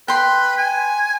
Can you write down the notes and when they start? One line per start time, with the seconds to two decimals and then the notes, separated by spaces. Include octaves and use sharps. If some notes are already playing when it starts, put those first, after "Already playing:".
0.08 B4 G5 C6
0.57 G#5